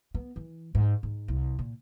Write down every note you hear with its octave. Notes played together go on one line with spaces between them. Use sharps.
B3
E3
G#2
G#2
C2
A#2